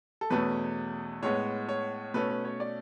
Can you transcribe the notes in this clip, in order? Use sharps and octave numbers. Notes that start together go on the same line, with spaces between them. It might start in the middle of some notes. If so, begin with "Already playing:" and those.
A4
E2 B2 A3 C#4 B4
A2 G#3 B3 C#5
C#5
B2 A3 C#4 B4
B4
C#5
D5